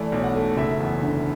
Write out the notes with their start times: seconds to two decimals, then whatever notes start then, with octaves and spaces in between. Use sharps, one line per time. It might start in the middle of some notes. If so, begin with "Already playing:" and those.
Already playing: E3 A3 D5
0.12 B1
0.24 F#5
0.36 A3
0.57 F#1 E5
0.80 E2
1.02 D3